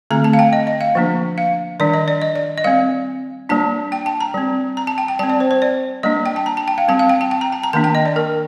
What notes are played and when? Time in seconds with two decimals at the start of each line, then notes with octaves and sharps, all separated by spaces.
0.10 D3 A3 C4 A#5
0.24 A5
0.33 F5
0.39 G5
0.53 D#5
0.67 D#5
0.81 F5
0.95 F3 A#3 D4
1.38 F5
1.80 D#3 G3 D4 D5
1.94 D#5
2.08 D5
2.22 D#5
2.36 D5
2.58 D#5
2.64 G3 C4 F5
3.49 G3 A#3 D4 A5
3.92 G5
4.06 A5
4.20 A#5
4.34 G3 C4
4.77 A#5
4.87 A5
4.98 G5
5.08 G5
5.19 G3 A5
5.23 C4
5.30 D5
5.40 C5
5.51 C5
5.62 D5
6.03 G3 A#3 D4 D#5
6.26 G5
6.36 A5
6.46 A#5
6.57 A5
6.68 G5
6.78 F5
6.88 G3 C4 A5
6.99 F5
7.09 G5
7.21 A5
7.31 G5
7.41 A#5
7.52 A5
7.63 A#5
7.73 D#3 A#3 D4 A5
7.84 G5
7.95 D#5
8.05 D5
8.16 A#4